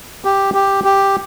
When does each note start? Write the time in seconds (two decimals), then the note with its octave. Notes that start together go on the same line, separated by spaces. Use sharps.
0.25 G4
0.54 G4
0.84 G4